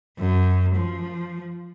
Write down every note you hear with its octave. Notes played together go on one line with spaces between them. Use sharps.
F#2
F3